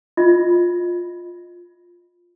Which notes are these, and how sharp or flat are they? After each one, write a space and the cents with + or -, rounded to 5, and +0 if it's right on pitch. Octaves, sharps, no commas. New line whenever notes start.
F4 -5 D#5 -10